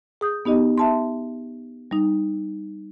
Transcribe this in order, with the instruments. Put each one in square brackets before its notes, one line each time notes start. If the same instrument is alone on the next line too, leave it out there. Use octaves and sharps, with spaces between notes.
[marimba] G#4 D#6 G6
B3 D#4 G4 D#5
E5 A5 C6
G3 D#4